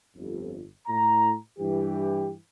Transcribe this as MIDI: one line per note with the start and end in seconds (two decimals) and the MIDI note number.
0.17 0.62 31
0.17 0.62 41
0.87 1.33 45
0.87 1.33 82
1.59 2.33 43
1.59 2.33 52
1.59 2.33 67